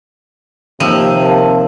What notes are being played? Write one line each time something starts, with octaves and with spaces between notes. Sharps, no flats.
D#2 C3 F3 E6 D#7
A#4 F5 A5